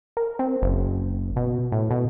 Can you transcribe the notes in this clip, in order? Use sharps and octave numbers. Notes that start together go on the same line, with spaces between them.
A#4
C4
F#1
B2
A2
B2